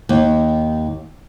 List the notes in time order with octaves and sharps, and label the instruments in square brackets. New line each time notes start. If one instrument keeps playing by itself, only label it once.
[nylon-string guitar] D#2